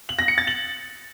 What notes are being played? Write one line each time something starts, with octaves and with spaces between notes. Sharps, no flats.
F#7
A#6
C#7
A6
F#7